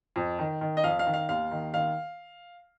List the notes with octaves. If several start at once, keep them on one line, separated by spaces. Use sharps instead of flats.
F2
D#3
D#3
D#5
F2 F5
F5
D#3
F5
D#2 F5
D#3
D#3 F5